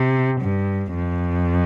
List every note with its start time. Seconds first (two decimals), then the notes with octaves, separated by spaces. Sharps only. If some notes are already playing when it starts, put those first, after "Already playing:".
Already playing: C3
0.41 G2
0.94 F2